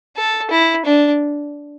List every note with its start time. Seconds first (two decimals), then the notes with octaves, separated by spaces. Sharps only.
0.17 A4
0.51 E4
0.86 D4